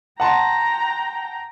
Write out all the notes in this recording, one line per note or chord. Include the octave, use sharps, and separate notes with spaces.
F#5 G5 A5 A#5 C6